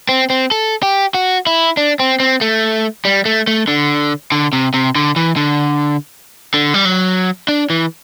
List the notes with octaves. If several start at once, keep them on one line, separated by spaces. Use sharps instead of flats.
C4
C4
A4
G4
F#4
E4
D4
C4
C4
A3
G3
A3
A3
D3
D3
C3
C3
D3
E3
D3
D3
G3
F#3
D4
E3